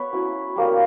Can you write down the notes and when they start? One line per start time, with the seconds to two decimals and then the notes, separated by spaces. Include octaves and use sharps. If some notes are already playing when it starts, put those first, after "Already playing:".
Already playing: B3 B4 C#5
0.13 F#3 C#4 E4
0.56 G3 A#3 C#4